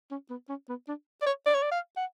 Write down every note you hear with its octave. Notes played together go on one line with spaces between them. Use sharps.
C#4
B3
C#4
B3
D4
D5
C#5
D5
C#5
D5
F5
F#5